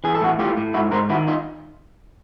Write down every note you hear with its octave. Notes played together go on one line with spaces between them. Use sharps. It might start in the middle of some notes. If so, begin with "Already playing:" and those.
E3 G#4
A4
A2 F#4 G#4
A2 F4 G4
A2
G#2 E4 F#4
G#2 A#4 C5
D#3 E4 F#4
D#4 F4